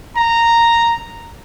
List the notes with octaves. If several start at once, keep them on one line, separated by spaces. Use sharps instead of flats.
A#5